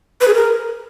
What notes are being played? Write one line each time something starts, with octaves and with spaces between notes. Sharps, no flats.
B4
G#4
A#4